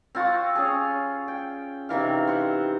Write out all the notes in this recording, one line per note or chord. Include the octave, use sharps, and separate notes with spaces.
C4 F4 F#5 C#6
C#4 G#4
G5
C3 D#3 E3 F5
C5 F#5